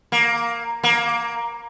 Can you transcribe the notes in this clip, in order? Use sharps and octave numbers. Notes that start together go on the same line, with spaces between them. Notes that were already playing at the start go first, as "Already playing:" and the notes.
A#3
A#3